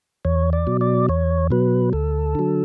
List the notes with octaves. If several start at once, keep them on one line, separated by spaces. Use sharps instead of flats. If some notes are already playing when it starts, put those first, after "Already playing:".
E2 C#5
D5
B2 F#3
D5
E2 C#5
B2 F#3 B4
D2 A4
D3 F#3